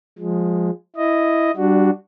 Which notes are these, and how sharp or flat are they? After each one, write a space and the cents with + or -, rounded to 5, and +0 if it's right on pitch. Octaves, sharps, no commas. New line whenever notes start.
F3 +20 G#3 +0
E4 +0 D#5 +0
G3 -20 D4 +0 F#4 +0